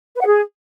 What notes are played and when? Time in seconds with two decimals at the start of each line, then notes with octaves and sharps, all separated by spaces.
0.15 B4
0.20 F#5
0.26 G#4